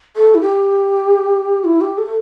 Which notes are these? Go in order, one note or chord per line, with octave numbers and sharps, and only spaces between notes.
A4
E4
G4
E4
G4
A4